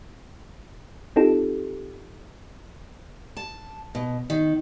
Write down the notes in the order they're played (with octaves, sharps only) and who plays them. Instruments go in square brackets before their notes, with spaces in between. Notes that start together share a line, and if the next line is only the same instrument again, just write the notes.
[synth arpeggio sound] C4 D#4 F4 G4 A4
[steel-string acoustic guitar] A5
B2
D#3